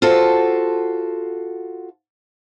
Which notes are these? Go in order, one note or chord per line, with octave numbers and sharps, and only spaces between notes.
F4 F#4 A4 C5